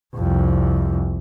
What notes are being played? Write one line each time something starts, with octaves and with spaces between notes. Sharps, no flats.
C2 F2